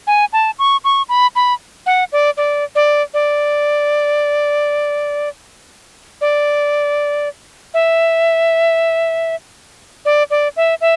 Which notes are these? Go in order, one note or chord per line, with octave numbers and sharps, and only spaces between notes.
G#5
A5
C#6
C#6
B5
B5
F#5
D5
D5
D5
D5
D5
E5
D5
D5
E5
E5